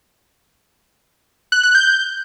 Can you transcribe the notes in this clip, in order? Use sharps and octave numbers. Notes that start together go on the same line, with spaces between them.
F#6
F#6
G6